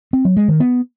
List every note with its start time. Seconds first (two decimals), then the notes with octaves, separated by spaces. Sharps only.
0.13 C4
0.25 F#3
0.37 G#3
0.48 D#3
0.60 B3